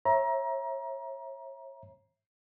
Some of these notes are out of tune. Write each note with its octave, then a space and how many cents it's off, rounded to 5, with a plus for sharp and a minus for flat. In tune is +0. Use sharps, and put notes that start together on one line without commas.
C#5 -35 E5 +0 A#5 +25